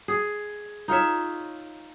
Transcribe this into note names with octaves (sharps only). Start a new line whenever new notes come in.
G#4
D#4 F4 C#5 E5